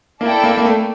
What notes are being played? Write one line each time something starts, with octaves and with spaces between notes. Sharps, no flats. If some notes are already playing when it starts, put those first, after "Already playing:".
A#3 E4 A4 D5 G5
A#3
A#3
A3